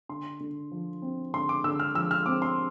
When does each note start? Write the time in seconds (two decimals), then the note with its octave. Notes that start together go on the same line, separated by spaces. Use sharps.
0.09 D3 C6
0.40 D3
0.72 F3
1.02 C4
1.34 D3 C6
1.49 D6
1.64 D3 E6
1.80 F6
1.95 F3 E6
2.11 F6
2.26 C4 D6
2.42 C6